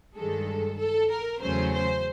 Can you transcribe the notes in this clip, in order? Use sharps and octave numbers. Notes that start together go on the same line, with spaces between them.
G2 D#3 G#3 A4
A4
A#4
E2 C#3 F#3 A3 C#4 C5
C5